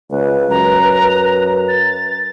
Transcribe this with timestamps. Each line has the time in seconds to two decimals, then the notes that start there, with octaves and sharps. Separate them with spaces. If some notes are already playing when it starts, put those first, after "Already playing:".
0.11 C#2 B4
0.50 F#2 A#5
1.68 A6